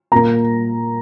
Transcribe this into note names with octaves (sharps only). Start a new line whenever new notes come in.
A#2 A#3 A#5